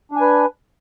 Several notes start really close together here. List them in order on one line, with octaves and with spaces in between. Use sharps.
D4 G#5 B4